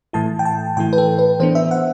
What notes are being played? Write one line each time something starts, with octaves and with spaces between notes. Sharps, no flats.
A2 E3 A3 E4 A5
G5
A5
A2 E3 A3 E4 G5
B4
A4
B4
E3 B3 D4 C5
E5
F#5